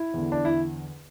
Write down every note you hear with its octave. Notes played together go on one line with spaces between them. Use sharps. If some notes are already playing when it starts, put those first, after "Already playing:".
Already playing: E4
E2 D3
D4
E4